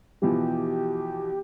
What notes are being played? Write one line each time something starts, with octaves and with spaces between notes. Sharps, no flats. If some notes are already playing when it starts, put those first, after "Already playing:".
B2 E3 F3 G4